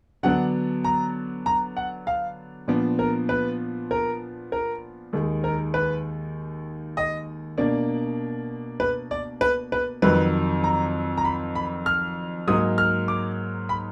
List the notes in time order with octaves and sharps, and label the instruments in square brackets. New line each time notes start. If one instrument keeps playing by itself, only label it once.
[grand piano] D3 F#3 B3 D4 F#5
A#5
A#5
F#5
F5
A#2 F3 B3 D4 D5
A#4
B4
A#4
A#4
D#2 D#3 G#3
A#4
B4
D#5
B2 A#3 D4 D5
B4
D5
B4
B4
F2 D#3 F#3 B4
A#5
A#5
B5
B5
F6
G#2 F#3 A#3 D#4 D#6
F6
D6
B5